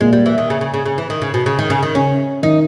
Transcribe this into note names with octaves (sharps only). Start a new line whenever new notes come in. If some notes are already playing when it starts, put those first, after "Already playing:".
A#2 G#3
G3
E3
D#3
C#3
C#3
C#3
C#3
E3
D#3
C#3
B2
C#3
D#3
C#3
D#3
C#3 C#4
D#3 D#4